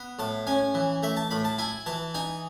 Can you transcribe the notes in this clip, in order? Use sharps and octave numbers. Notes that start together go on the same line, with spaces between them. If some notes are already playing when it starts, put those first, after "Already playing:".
Already playing: B3
A2 A5
C#4 G#5
E3
A3 E5
A5
A2 B5
A5
E4 G#5
E3 A5
D#4 G#5